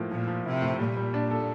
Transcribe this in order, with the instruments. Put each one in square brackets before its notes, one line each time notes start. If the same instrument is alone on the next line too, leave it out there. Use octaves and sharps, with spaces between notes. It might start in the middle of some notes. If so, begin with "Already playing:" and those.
Already playing: [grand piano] A2 F3 A#3 E4
[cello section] A#2 [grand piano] F3
[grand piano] F3
[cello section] C3 [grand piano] E4
[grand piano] A2
[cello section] A#2 [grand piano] G3
[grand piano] G3
D4
A4